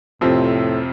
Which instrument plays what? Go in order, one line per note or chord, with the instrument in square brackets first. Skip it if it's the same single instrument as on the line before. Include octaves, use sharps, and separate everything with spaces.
[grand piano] F2 C3 F3 C4 [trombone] A2